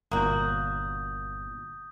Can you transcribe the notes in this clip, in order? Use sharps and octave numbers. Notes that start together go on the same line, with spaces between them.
G1 A#2 A#3 F#4 D#6 G6